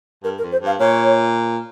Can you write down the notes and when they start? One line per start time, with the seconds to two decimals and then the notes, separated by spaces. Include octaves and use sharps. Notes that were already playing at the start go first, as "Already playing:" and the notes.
0.24 G2 A#4
0.38 A#4
0.43 F2
0.52 C5
0.62 G2 F5
0.79 A#2 C#5